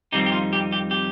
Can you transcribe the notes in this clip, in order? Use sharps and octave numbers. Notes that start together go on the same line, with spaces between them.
F2 D#3 G3 C4 D#4 G4
G4
F4
G4
G4
G4